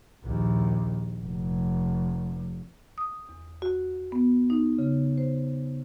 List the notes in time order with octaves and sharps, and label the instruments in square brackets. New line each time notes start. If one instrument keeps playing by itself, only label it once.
[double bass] A#1 D#2
F1
[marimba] D#6
E2
F#4
B3
D#4
C#3
C5